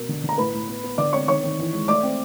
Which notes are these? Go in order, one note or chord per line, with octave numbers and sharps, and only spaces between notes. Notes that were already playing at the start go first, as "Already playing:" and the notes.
Already playing: B2 A#4
D3
D3
A#5
A2 B4 B5
A2
B3
B3
D3 D5 D6
C4 C#5 C#6
D#3 C#5 C#6
D#3
E3
G#3
A3 D5 D6
C4